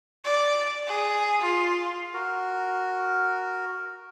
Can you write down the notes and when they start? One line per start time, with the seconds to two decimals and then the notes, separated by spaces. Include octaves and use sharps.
0.24 D5
0.87 G#4
1.41 F4
2.14 F#4 A#4